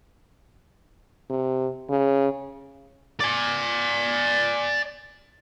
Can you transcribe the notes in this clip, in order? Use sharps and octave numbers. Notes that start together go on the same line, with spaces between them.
C3
C#3
D5 G#5